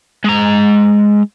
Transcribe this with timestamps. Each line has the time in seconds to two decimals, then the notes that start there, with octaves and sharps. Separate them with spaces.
0.24 G#3 A#5